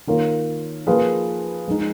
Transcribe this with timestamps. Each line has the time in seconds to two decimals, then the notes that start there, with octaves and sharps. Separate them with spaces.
0.07 D#3 A#3 F4 A#4 C#5
0.87 F3 A#3 F4 G#4 B4
1.68 F3 G#3 D#4